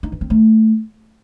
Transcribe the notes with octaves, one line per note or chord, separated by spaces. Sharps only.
D#4
E3
C4
A3